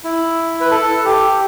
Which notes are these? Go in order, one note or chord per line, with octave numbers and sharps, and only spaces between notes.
E4
B4
A4
G4